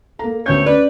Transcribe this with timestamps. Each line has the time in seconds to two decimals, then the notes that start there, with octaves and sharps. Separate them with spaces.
0.19 A#3 A4 A#5
0.46 D2 A3 B3 C#4 G4 C#5 G6
0.66 C#4 B4 D5